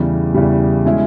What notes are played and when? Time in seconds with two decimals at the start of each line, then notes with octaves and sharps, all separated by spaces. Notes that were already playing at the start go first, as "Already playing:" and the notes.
Already playing: E2 C#3 E3 G3
0.34 E2 C#3 E3 G3
0.86 B2 G#3 C#4 E4